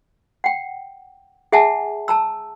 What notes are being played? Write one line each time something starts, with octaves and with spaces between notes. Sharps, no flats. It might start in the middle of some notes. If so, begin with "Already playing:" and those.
F#5 G5
G#4 E5 F#5 G#5 A5
A5 A#5 E6